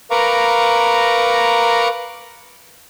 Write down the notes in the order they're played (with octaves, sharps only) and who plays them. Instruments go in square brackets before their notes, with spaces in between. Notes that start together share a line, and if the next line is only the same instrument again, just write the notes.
[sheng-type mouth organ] A#4 B4 F5 A#5 C#6 D6